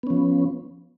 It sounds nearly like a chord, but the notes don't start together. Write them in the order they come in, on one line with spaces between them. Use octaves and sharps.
B3 C#4 F3